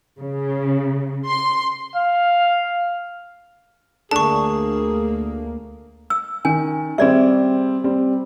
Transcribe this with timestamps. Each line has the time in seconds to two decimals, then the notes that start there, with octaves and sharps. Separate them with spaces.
0.19 C#3
1.27 C6
1.96 F5
4.11 D2 A3 A#3 D4 G#4 A5 C#6
6.10 E6
6.45 D#3 C#4 G#5
6.98 G3 C4 G#4 D5 E5
7.84 G3 C4